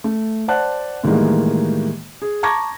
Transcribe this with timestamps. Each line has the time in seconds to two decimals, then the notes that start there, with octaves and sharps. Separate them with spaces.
0.04 A3
0.48 C5 D5 F#5 A5 F#6
1.04 A2 D#3 E3 G3 G#3 A#3
2.22 G#4
2.43 A5 A#5 C#6 D6 G#6 A#6